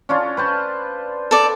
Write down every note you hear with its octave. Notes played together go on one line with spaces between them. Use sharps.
C#4 D4 F4
B4 C5 A5
A4 D5